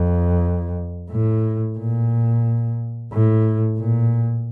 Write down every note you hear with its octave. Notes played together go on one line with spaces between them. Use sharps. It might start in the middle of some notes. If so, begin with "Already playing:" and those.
Already playing: F2
A2
A#2
A2
A#2